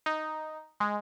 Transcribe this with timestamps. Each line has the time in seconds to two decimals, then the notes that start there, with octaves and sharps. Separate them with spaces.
0.06 D#4
0.80 G#3